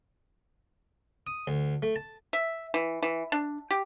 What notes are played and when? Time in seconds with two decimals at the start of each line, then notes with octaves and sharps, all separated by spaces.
1.27 D#6
1.47 D2
1.83 A3
1.96 A5
2.33 E5
2.74 E3
3.03 E3
3.32 D4
3.71 G4